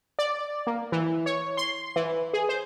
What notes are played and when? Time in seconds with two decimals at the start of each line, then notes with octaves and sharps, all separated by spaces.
0.19 D5
0.67 A#3
0.92 E3
1.26 C#5
1.57 C6
1.96 E3
2.33 G#4
2.49 C5